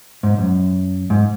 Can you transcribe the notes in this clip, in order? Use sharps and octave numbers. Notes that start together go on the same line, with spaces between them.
G#2
F#2
G#2